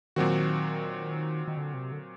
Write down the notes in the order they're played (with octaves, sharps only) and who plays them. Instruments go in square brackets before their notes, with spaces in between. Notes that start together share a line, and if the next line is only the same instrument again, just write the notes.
[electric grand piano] A#2 F#3 C4 F#4 [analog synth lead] D#3
[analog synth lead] D#3
D3
C3
D3